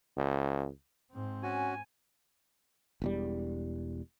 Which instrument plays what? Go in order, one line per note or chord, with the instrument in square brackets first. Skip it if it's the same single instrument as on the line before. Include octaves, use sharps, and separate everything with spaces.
[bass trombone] C#2
[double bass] G#2 C4
[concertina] C#4 F#4 [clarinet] G#5
[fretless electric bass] E1 E2 G3